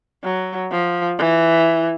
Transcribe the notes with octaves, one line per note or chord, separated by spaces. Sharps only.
F#3
F3
E3